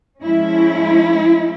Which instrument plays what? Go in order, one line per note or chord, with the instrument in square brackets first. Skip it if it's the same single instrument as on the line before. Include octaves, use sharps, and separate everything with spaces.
[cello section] F3 G#3 C#4 E4